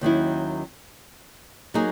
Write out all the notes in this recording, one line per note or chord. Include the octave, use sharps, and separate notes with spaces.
D#2 D#3 F#3 C#4 E4
F#3 A#3 D#4 G#4